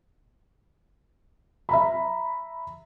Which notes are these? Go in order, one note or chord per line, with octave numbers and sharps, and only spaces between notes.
E5 A#5 B5